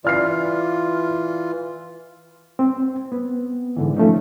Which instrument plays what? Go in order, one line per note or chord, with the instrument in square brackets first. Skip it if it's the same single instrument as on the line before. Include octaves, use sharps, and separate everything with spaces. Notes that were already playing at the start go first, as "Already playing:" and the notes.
[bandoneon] E3 F4 [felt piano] D5 F6 C7
[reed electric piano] C4
B3
G#2 D3 E3
F3 A3 C#4 D#4